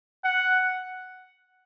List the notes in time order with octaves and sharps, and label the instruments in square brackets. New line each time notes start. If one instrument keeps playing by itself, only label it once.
[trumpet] F#5